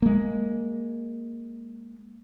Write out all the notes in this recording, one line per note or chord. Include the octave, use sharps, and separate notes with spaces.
G#3 A#3